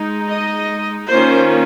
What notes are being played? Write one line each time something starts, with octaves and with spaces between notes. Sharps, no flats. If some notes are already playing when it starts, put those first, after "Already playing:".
Already playing: G#3 D#4
D#5
D#3 A#3 C#4 F4 C5